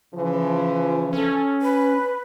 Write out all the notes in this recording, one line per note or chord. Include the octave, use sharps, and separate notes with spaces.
C#3 E3 F3
C#4 A4
B4